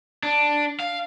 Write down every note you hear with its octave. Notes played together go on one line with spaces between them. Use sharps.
D4
F5